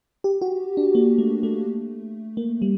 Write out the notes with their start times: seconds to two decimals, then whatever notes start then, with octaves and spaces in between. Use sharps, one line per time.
0.24 G4
0.41 F#4
0.77 D4
0.95 A#3
1.18 A3
1.43 A3
2.37 A#3
2.62 G3